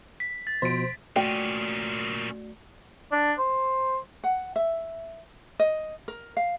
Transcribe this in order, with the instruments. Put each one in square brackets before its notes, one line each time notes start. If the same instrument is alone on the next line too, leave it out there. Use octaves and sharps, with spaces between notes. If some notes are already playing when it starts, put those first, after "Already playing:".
[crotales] B6
A6
[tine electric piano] B2 F3 [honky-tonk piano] C5 D7
[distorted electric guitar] A#2 C#4 [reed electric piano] A3 F#4 D5 [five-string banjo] G5
[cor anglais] D4
C5
[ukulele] F#5
E5
D#5
A#4
F5